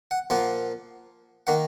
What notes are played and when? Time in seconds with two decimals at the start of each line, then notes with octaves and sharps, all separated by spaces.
0.11 F#5
0.30 A#2 F3 A#3 F#5
1.47 D#3 A#3 F#5